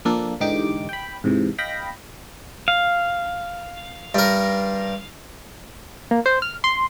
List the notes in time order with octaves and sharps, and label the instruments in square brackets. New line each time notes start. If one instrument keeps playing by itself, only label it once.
[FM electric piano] F3 A#3 D4 A4
G#2 D3 E3 D#4 G4 D6
G5 B5
G#2 C3 E3
D#5 F5 G5 B5 A#6
[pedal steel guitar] F5
[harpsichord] G2 A#4
[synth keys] A#3
C5
F6
C6